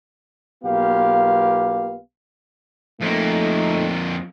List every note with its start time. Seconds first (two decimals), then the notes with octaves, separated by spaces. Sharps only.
0.64 B1 A#3 B3 F4 G4 F5
3.01 F2 A3 A#3 D#4